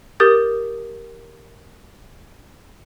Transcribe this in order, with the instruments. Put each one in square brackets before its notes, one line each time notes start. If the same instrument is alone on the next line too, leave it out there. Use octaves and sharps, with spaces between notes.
[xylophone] G4 A#4 D#6 G6 A6